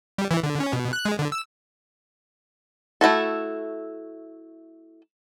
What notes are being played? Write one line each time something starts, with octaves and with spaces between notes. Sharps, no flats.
G3
E3
D3
C#4
B2
F#6
G#3
D3
E6
A3 E4 F#4 A4